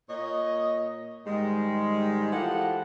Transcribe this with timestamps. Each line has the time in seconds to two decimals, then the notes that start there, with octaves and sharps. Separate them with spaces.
0.09 A#2 C#5 D#5
1.26 G#2 D#3 G3 G#3
2.31 E3 F3 G4 A4 F#5